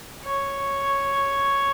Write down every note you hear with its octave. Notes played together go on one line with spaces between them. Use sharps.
C#5